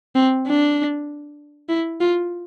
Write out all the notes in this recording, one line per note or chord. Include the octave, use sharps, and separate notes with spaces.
C4
D4
E4
F4